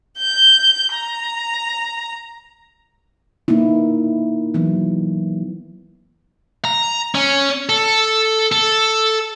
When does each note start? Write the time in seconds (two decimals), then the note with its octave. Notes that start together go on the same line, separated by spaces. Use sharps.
0.17 G6
0.93 A#5
3.48 A#3 B3 D#4 E4
4.54 E3 F#3 B3
6.65 A#5
7.15 C#4
7.69 A4
8.52 A4